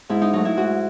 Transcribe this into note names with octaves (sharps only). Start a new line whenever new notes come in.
G#2 E4
D#4
F#3 A3 D#4
E4
G#2 F#4